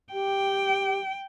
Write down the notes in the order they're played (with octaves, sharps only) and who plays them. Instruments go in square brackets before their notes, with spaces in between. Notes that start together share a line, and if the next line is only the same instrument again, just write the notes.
[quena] G4 [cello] G5